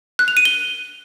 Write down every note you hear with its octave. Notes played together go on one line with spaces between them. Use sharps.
F#6
F7
D#7
G7